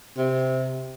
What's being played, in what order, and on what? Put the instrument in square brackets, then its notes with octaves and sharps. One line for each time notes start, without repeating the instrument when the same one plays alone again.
[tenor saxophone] C3